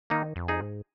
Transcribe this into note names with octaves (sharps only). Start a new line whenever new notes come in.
D#3 A#3 D#4
F2
D#4 G#4
G#2